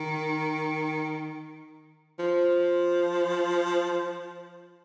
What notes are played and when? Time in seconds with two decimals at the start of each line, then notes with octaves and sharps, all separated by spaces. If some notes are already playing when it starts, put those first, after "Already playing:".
Already playing: D#3
2.19 F3